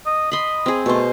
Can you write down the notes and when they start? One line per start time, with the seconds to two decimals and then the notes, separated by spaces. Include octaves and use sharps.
0.06 D#5
0.32 D#5 B5 C6
0.66 C4 G#4
0.86 B2 A3 C5